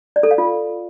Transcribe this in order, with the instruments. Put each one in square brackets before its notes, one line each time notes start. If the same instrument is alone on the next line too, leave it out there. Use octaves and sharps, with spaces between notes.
[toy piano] D5
A4
F5
F4